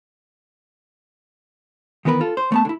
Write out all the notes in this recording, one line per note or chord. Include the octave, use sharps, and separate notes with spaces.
D#3 E3 B3 A#4 B4
F4 A4
C5
A3 B3 A5
D3 E4